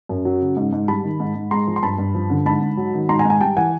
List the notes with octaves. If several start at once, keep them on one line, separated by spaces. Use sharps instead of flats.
F#2
F#3
C#3
G#2
G#2
G3 A5 B5
D#3
G#2
G#2
G#3 A#5 C6
F3
C6
G2 A5 B5
G2
F3
D3
G#2 A5 B5
G#2
F#3
D#3
G#2 A#5 C6
G#5 A#5
G#2
G#5 A#5
G3 G5 A5
E3 F#5 G#5